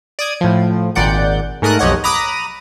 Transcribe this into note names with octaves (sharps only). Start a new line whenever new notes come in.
D5 D#6 G#6
A2 F3
G#1 A#2 D5 F#5 G6
G#2 A3 A#4 D#6 F#6
B1 F2 G4 C#5 D#5 F#5
A#5 B5 D6 D#6 F#6 A#6